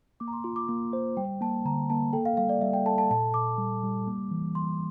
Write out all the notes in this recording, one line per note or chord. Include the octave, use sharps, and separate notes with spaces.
A#3 D6
A#5
C6
F4 C6
D6
A#3 D6
C5
G3 G5
A#3 A5
D3 A#5
A#3 A5
A4 G5
F5
G3 F5
D5
G3 E5
G5
A4 A5
A5
A#2 A5
A#2 D6
G3
G3
A#3
E3
E3 C6